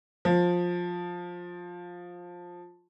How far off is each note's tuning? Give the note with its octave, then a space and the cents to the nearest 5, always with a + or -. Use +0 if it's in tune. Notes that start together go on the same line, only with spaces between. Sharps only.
F3 +15